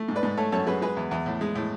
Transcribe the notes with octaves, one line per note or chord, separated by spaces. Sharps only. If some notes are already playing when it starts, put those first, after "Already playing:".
Already playing: A3
G#2
B4 D5
G#2
A3 A4 C#5
F#2 A4 C#5
F#2 G#4 B4
G#3 G#4 B4
E2
E2
A2
G#3
A2